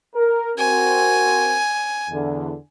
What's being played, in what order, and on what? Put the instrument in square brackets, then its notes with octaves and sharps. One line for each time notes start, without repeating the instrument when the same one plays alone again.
[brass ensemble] A#4
[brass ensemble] C4 F#4 A#4 [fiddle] G#5
[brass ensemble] E2 D3